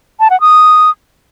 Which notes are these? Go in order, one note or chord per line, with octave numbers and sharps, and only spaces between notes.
A5
F#5
D#6